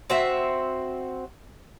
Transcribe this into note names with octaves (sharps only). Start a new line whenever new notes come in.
C4 F#4 E5